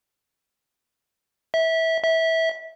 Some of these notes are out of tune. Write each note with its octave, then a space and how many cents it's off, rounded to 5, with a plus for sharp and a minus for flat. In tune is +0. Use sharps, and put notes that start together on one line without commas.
E5 -20
E5 -20